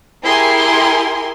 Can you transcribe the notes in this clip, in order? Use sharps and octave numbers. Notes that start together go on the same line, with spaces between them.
E4 G4 G#4 A#4 G#5 C6